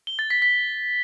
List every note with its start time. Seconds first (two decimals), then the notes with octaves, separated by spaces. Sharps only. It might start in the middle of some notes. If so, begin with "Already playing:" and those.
0.07 G7
0.19 A6
0.30 B6
0.42 B6